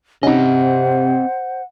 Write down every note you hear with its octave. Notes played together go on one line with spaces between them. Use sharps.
C3 C4 C#4 D#4 C5 D#5 F#5